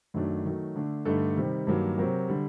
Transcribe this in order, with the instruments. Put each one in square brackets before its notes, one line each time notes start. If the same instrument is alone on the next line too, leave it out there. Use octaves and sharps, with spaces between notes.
[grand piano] F#2 D#3 F#3 A3 D4
D#3 F#3 A3
D3 A3 D4
G2 D3 A3 D#4 A4
C3 D#3 G3
G2 D#3 F#3 A#3
C3 F#3 C4 F#4 A#4
D3 G3